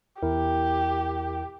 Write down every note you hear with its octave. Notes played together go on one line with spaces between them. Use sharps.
E2 E4 G4 A#4